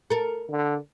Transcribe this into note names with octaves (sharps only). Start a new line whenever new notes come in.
A4 A#4
D3